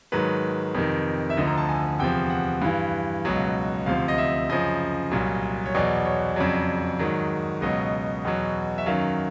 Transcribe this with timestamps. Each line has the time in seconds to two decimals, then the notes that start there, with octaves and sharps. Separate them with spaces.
0.12 G#2 D#3 F#3 B4
0.75 F2 C3 D#3
1.30 E5
1.37 D2 D3 F3 D#5
1.47 A#5
1.57 A5
1.68 G#5
1.99 E2 C3 F3 G5
2.30 F#5
2.62 G2 E3 F5
3.25 C#2 B2 F#3
3.86 D2 C3 F3 F5
4.08 D#5
4.18 E5
4.49 F#2 C#3 F3 D#5
5.11 C2 A#2 F#3
5.66 C#5
5.74 E2 B2 F#3 D5
6.05 C#5
6.36 F2 C#3 F#3 D5
6.99 G#2 D#3 F#3
7.61 C#2 B2 F#3 D#5
8.24 E2 B2 F#3
8.78 E5
8.86 F#2 D#3 F#3 F5